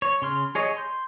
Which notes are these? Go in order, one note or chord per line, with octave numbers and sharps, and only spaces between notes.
C#5
C#3 C6 F6
G#4 C#5 D#5
C6 G6